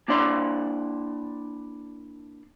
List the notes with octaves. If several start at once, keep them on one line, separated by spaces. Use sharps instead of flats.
A#3 D4 E4 D5 C6